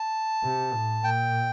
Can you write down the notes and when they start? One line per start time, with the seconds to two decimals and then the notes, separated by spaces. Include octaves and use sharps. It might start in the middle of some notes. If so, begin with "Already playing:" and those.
Already playing: A5
0.43 C3
0.74 A2
1.04 A#2 G5